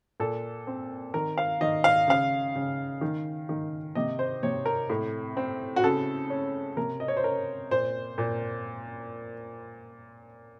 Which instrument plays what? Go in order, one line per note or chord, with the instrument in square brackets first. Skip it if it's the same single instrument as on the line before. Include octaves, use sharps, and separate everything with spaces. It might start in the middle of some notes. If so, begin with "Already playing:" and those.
[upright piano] A#2 A4
C4
D#3 A#4
F5
D#3 D#5
F5
C#3 F5
C#3
D#3
D#3
C3 D#5
C5
C3 C#5
A#4
A2
C4
F#4
C#3 A4
C#4
C3 A#4
D#5
C#5
C5
C#4 A#4
A#2 C5
A#2